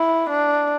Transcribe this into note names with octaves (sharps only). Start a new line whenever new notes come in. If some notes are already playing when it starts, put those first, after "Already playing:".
Already playing: E4
D4